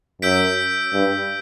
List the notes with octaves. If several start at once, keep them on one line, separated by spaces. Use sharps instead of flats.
F#2 E6 G6 B6 D7
G2